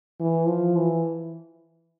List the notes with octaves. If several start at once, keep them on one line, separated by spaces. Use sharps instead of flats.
E3
F3
E3